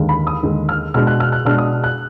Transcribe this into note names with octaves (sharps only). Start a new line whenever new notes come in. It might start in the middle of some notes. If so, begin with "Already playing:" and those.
Already playing: D#2 D3 G#3
B5
D#6
D#2 D3 G#3
F6
B2 G#3 D4 F6
F#6
F6
F#6
B2 G#3 D4 F6
D#6
F#6